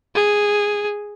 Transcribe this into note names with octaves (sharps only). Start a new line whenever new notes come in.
G#4